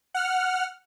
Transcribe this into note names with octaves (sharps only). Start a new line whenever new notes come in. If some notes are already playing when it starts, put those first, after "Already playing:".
F#5 F6